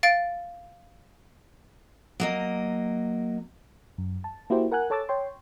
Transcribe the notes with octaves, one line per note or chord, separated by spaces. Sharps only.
F5 A6 D7
F#3 A#3 D#5
F#2
A5
A#3 E4 F#4 G4 C5
A#4 F#5 G#5 F#6
A4 C#5 A5 D6 E6 A6
C#5 G5 C6